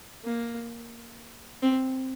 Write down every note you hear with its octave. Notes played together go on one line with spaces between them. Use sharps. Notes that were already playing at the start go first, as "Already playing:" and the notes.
A#3
C4